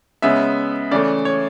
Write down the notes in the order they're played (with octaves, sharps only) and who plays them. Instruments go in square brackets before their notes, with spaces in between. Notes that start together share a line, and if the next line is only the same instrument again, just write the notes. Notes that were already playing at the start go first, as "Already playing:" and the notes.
[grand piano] C#3 G#3 B3 E5
C#3 E3 A3 D5
C#5